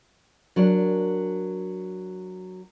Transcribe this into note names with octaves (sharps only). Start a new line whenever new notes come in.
F#3 D4 A#4